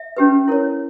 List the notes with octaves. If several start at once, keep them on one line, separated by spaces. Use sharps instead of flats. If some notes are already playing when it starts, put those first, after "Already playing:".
Already playing: E5
C#4 G4 B4
E4 A#4 C#5